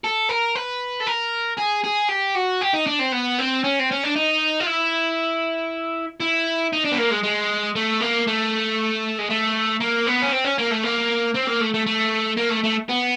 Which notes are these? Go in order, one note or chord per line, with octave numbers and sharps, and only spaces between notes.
A4
A#4
B4
A4
A#4
G#4
G#4
G4
F#4
G4
D#4
D4
C4
B3
C4
C#4
C4
C#4
D4
D#4
F4
E4
E4
D#4
D4
B3
A#3
G#3
G#3
A3
A#3
A3
G#3
A3
A#3
B3
C#4
C4
C#4
A#3
A3
A#3
C4
A#3
A3
A3
A3
A#3
A3
A3
B3